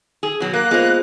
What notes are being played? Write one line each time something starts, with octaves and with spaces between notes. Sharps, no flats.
G#4
B2 F#3
A#3 F#6
G#3 A#3 B3 F4 C5